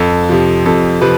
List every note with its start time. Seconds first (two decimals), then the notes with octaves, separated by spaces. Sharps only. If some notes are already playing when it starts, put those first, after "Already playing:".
Already playing: F2 A4
0.29 C3 F3
0.66 F2 A4
1.01 C3 F3 B4